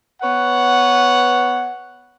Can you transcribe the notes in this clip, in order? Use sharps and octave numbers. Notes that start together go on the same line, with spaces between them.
B3 B4 C#5 F#5